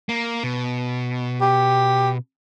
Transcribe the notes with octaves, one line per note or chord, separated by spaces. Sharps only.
A#3
B2
G4